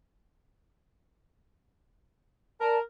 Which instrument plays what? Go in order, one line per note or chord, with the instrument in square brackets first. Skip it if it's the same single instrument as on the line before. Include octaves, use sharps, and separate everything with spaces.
[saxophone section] A#4 [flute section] D5 A5